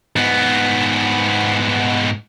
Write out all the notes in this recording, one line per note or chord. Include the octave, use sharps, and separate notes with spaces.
G#2 B3